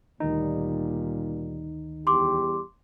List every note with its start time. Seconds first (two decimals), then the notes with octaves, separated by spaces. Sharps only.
0.20 D2 A#2 D#3 G3 D#4
2.07 E2 G3 G4 C6 D6